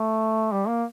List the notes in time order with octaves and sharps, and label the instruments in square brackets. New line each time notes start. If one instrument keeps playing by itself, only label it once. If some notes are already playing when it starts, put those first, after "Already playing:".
Already playing: [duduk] A3
G3
A#3